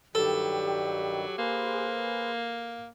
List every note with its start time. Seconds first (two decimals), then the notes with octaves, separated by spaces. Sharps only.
0.15 G2 D#3 F#3 G3 G4 A4
1.38 A#3 G#4 B4 C5